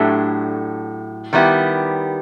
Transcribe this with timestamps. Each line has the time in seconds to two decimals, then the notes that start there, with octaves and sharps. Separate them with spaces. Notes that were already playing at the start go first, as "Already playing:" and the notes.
Already playing: A2 F#3 A3 D4 G4
1.33 D#3 G3 B3 E4 G4